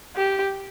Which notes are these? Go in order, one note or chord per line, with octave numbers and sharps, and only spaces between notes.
G4